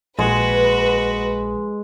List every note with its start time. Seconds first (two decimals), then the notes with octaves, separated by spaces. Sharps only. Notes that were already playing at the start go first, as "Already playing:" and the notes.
0.19 A#1 G#3 F#4 B4